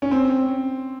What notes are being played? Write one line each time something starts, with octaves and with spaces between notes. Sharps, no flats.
C#4
C4